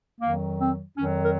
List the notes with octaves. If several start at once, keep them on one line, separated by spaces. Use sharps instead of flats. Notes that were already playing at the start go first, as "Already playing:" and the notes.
F2 D#3 F#3 A#3
C4
F2 D#3 F#3 C#4
A#4